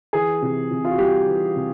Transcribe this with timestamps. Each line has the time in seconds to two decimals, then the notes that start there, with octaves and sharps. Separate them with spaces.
0.13 E3 G#4
0.42 C3
0.71 C3
0.85 F4
0.91 F#4
0.98 G3 G4
1.27 E3
1.56 C3